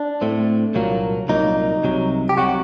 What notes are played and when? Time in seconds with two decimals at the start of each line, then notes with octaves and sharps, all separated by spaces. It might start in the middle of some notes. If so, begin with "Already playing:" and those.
Already playing: D4
0.21 A2 A3 C4
0.75 C2 A#2 F#3 A#3
1.28 C2 A#2 F#3 A#3 D#4
1.83 C2 C3 F#3
2.29 G4
2.37 C2 C3 F#3 F#4